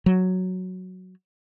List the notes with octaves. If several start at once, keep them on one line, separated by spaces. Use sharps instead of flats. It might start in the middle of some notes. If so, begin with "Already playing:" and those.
F#3